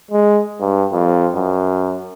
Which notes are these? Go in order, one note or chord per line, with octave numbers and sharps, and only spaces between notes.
G#3
G2
F2
F#2